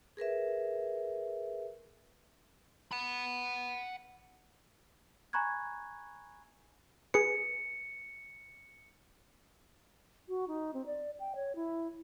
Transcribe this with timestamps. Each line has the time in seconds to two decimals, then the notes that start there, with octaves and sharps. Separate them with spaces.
0.17 G#4 A#4 B4 E5
2.92 F#5 B5
5.33 G#5 A#5 B5 C#6 F#6 G#6
7.14 G#4 B4 C#7
10.28 F#4
10.48 D#4
10.74 C4
10.86 D5
11.19 G5
11.35 C#5
11.55 E4